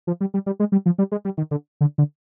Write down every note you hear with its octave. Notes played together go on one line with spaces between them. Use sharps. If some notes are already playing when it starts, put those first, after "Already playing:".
F3
G3
G3
G3
G#3
G3
F3
G3
G#3
G3
D#3
D3
D3
D3